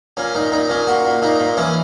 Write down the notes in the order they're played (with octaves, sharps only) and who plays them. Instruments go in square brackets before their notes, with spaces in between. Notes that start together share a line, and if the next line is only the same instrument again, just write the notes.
[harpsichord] A#2 C#4
A#2 D#4
A#2 D#4
A#2 C#4
A#2 F#4
A#2
A#2 D#4
A#2
E3 C#4